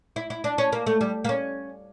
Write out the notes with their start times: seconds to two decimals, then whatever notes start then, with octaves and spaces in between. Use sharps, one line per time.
0.16 E4
0.30 E4
0.44 D4
0.58 C#4
0.72 A#3
0.87 A3
1.01 G3
1.24 A#3
1.29 C#4